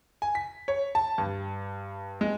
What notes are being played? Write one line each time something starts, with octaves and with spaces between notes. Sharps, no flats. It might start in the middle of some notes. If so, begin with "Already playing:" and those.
G#5
B6
C#5
A5
G2
G#3